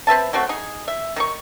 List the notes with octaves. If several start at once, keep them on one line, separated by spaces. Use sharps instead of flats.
C4 B4 E5 A5
F#3 A3 C4 F#4
D#4 G#4
E5
D#3 D#4 C#6